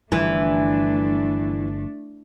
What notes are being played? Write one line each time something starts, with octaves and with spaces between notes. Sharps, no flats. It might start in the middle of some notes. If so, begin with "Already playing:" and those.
G1 G2 E3 F3 A3 D4